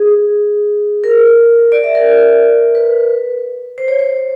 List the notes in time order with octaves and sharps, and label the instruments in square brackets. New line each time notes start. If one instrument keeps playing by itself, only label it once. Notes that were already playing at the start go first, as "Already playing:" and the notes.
Already playing: [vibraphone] G#4
A#4
D5
E5
A#4
B4
C5
C#5
C5